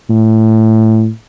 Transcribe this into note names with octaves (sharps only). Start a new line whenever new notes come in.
A2